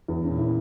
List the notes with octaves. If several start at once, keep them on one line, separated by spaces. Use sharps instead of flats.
E2
A#2 C#4
E4